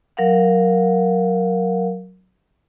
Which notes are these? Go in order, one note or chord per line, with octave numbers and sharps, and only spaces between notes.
F#3 A#4 F5 F#5